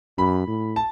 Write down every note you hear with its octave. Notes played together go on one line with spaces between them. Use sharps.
F#2 B5
A2
A5